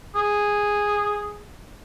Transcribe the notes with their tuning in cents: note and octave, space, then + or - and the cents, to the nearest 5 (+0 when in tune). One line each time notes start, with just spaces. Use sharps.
G#4 -5